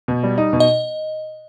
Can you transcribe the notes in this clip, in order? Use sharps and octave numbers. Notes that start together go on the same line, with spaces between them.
B2
G3
D#4
B2
D#5